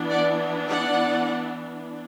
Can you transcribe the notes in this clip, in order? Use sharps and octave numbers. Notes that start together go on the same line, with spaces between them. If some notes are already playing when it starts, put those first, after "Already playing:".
Already playing: E3 B3 D4
D5 F#5
D5 F#5